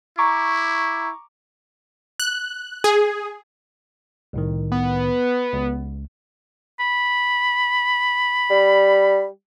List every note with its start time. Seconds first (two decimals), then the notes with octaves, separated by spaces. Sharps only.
0.18 E4 A#5 C#6 D6
2.20 F#6
2.84 G#4
4.33 C2 A2 D#3
4.72 B3
5.53 C#2
6.80 B5
8.50 G3